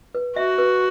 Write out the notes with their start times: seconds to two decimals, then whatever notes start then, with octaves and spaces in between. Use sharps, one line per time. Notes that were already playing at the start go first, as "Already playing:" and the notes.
0.15 B4
0.36 F#4 E5
0.58 B4